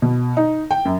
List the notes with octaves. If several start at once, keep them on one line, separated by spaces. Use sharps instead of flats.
B2
D#4
G5
F#2